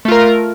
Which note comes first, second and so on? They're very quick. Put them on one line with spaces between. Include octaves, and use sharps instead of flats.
A3 F4 A#4